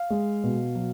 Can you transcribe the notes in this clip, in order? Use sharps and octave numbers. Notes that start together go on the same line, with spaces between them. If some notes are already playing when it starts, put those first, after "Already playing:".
Already playing: F5
G#3
B2
F#3